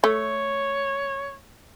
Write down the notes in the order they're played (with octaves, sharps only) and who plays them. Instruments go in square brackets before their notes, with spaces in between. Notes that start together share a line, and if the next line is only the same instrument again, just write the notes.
[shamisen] A3 [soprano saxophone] C#5